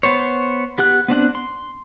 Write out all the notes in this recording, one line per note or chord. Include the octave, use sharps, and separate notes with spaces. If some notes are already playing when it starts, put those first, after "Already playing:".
B3 C5 C#5
B3 G4 F#5 F#6
B3 C4 D4 F#5
C6